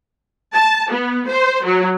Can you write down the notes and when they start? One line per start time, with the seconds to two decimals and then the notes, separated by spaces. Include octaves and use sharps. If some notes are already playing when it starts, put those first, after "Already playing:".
0.53 A5
0.90 B3
1.27 C5
1.64 F#3